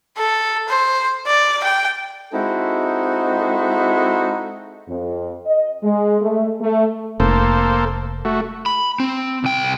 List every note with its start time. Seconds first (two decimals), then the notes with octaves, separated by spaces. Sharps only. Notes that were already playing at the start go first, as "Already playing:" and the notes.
0.17 A4
0.69 C5
1.27 D5
1.64 G5
2.33 G#3 C4 D#4 E4 F#4 A4
4.88 F2
5.46 D#5
5.83 G#3
6.22 A3
6.61 A3
7.20 F1 A#3 A4 C5
8.25 A3 F#4
8.66 B5
9.00 C4
9.44 C2 G5